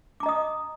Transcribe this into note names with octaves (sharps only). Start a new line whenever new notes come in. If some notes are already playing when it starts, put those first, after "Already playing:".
D#5 A#5 D6 D#6